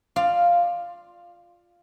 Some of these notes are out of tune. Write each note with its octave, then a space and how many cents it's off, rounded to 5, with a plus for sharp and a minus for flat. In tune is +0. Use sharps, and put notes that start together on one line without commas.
F4 +0 D5 +20 F5 -5